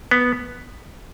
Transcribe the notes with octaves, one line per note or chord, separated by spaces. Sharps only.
B3